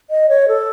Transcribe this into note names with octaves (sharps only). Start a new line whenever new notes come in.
D#5
C#5
A4